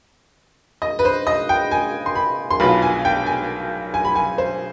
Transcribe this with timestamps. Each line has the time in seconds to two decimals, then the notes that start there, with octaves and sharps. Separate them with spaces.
0.82 D#5
0.99 B4
1.05 C5
1.27 D#5
1.49 G5
1.71 G#5
2.06 C6
2.15 B5
2.51 C6
2.60 B1 B2 B3 F4 B5
2.82 G#5
3.05 G5
3.26 G#5
3.94 G#5
4.05 B5
4.16 G#5
4.38 C5